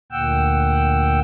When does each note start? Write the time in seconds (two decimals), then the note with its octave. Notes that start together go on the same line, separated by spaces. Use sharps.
0.12 D2 A#2 F#5 G5 E6